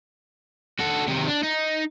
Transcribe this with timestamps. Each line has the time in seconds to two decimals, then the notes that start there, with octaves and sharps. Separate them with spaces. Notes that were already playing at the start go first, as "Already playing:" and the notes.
0.79 F#4 A4
1.08 C3 D#3
1.27 D4
1.43 D#4